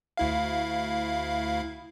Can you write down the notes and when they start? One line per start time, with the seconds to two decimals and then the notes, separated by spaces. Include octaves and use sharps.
0.17 D2 E4 F5